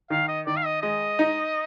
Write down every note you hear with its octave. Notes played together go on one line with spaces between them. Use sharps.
D#3 F5
D#5
D#3 D5
F5
D#5
G#3 D#5
D#4